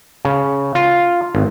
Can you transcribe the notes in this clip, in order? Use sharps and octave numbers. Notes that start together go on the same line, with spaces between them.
C#3
F4
G#1